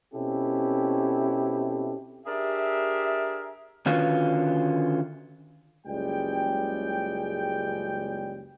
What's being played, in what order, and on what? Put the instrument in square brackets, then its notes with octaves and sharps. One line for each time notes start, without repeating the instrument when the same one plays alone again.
[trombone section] B2 C4 C#4 E4 G4 A4
[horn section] D4 G4 G#4 A#4 E5
[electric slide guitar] D3 D#3 C#4 F4 F#4 B4
[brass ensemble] F#1 C#2 G3 G#3 G#4 G5